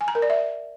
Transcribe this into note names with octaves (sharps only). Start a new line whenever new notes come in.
G#5
A#5
A#4
D5
E5